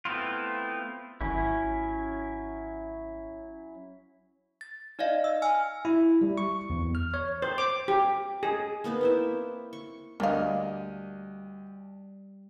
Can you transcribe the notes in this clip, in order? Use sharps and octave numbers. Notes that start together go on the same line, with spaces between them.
A3 B3 C4 E4 F4
G#1 F#3 C#4 E4
A6
D#4 D5 D#5 F5
E6
G#5 E6 F6
E4
G3
C#6
E2
F6
C#5
C5
D6
G4
G#4
A#3 B3 D#4 B4
C4 E4 E5
C#6
D2 G3 A#3 D#5 F5